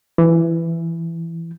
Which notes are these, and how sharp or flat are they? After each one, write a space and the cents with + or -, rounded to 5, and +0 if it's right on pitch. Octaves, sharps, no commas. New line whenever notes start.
E3 +15